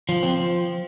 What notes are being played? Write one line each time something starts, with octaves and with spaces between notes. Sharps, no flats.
F3
C4